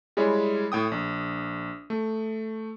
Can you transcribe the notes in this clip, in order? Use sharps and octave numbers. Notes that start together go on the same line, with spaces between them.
G3 G#3 E4 G#4 C#5
A2 G5 D#6
A#1
A3